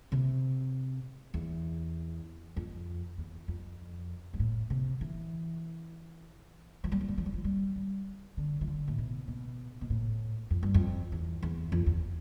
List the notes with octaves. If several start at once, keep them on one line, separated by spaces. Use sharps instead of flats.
C3
E2
F2
E2
F2
G2
A2
C3
E3
F3
G3
F3
G3
F3
G3
F3
G3
G3
D3
E3
D3
A2
B2
B2
B2
A2
F2
G2
F2
E2
E2
F2
E2